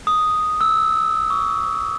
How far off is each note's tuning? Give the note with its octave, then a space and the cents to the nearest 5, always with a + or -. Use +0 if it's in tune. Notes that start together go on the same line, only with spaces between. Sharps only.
D#6 +0
E6 -10
C#6 +35